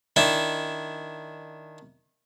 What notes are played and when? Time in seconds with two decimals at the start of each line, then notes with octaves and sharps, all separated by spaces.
0.16 D#3 D4 E4